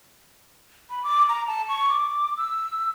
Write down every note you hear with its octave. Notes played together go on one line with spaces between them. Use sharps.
B5
D6
A#5
A5
C#6
D6
E6